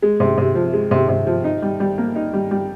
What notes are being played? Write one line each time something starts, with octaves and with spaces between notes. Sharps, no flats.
G#3
C3
C3
F3
G#3
C3
C3
F3
D#4
G3
G3
A#3
D#4
G3
G3